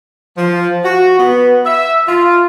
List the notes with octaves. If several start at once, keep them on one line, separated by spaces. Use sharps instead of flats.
F3
F#4
B3
E5
F4